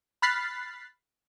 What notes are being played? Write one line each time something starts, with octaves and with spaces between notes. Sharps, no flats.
B5 F6 F#6 A6 B6 C7